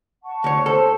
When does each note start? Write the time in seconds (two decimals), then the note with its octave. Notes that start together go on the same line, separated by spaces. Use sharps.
0.24 F#5 A5 C#6
0.44 D2 C#5
0.66 A4 C5